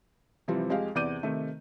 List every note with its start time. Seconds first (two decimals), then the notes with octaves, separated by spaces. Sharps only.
0.48 C3 E3 F3 G3 C4
0.69 F2 G#3 G4 F5
0.95 E2 C3 D5 D6 G6 D#7
1.23 C3 D#3 A3